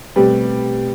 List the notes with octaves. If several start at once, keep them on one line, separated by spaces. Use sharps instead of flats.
B2 G3 A3 C4 G4 B4